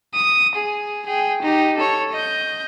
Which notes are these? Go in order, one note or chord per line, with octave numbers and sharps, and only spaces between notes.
D#6
G#4
G#4 G5
D#4 G4
A4 C#5
D#5 G6